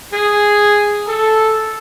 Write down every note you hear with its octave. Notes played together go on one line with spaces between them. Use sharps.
G#4
A4